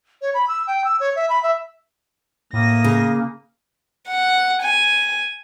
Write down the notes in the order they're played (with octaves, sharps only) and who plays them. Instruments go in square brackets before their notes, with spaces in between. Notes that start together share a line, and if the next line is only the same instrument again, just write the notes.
[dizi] C#5
B5
E6
G5
E6
C#5
E5
B5
E5
[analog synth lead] A2 [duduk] A#3 [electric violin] D#6 A#6
[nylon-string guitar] C#3
[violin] F#5
G#5